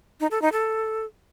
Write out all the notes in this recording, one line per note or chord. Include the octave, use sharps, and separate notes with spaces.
D#4
A4
D#4
A4